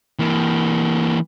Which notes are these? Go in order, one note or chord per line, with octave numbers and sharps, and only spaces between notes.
E3 A#3